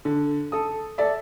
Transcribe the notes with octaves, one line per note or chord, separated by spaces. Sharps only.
D3
A4 D#6
A4 D5 E5